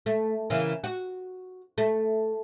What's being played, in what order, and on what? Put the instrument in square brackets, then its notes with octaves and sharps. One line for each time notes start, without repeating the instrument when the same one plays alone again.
[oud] A3
C#3 E3 A#3
F#4
A3